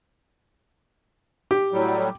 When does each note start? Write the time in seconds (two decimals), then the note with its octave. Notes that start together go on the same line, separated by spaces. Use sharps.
1.51 G4
1.72 A2 F#3 G3